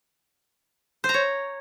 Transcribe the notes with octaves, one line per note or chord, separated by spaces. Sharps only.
C5
A#5
C#5